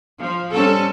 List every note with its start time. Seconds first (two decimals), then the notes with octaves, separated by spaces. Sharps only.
0.18 F3
0.52 G3 C4 C#4 A4